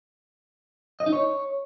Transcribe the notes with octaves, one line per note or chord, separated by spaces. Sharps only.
D#5
D#4
C#5